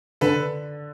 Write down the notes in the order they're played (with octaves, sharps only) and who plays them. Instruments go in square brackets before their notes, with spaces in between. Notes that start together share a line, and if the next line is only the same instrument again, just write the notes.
[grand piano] D3 [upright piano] A4 B4